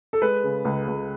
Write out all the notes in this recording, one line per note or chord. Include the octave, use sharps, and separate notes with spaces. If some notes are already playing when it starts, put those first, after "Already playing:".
A4
G#3 B4
C#3
C#2
C#2